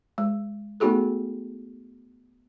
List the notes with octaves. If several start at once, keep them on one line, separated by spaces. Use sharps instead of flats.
G#3
A3 B3 D#4 F#4 G#4 A4